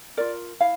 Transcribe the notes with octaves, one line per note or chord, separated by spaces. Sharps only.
F4 A#4 D5
E4 F5